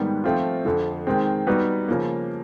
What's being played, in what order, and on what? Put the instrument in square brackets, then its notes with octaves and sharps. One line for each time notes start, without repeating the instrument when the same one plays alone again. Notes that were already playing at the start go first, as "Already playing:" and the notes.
Already playing: [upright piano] G#2 D#3 G3 B3
F3 A3 C4 F4
F2 D3 F3
D#3 G#3 C4
G3 B3 D#4 F#4 B4
C#3 F3 A#3